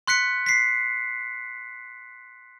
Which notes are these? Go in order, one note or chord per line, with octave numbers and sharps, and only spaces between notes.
C6 F#6 B6 C#7
B6 C7